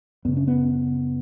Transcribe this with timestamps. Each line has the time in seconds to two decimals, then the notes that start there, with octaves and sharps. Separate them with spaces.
0.25 F#2 C#3 B3
0.37 C#4
0.48 B3